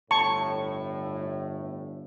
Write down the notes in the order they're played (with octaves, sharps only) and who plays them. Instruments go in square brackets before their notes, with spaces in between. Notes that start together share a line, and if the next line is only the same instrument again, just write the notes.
[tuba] G1 [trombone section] A2 [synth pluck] A5 [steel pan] C#6